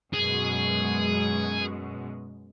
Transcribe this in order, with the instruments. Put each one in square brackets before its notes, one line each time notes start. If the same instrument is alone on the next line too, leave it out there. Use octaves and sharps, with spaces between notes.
[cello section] F#2 B2 G#3 [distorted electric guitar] G#4